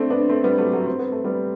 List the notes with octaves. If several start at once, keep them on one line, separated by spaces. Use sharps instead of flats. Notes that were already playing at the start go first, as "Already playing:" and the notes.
Already playing: A3 C4 D4
B3 D4
A3 C4
G3 B3
F#3 A3
F#3 A3
C4
B3
A3
G3 B3